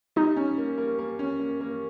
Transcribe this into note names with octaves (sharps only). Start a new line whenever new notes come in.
G3 D#4
C#4
A#3
A#3
A#3
C#4
A#3
A#3